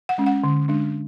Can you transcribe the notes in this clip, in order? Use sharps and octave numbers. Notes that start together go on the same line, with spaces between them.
F#5
G#3 C#4
F#5
D3
G#3 D4